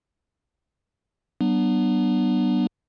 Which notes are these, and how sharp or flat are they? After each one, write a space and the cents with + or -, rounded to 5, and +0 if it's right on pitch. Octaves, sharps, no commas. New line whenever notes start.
F#3 +45 B3 -15 D4 +35